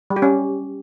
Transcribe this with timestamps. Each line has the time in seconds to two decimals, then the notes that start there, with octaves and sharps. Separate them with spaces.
0.10 G3
0.16 G4
0.22 C#4